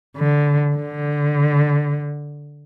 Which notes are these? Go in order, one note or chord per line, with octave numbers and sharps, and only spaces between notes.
D3
D3